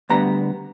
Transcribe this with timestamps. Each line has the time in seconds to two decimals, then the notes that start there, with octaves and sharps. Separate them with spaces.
0.10 D2 D3 G3 B3 A#5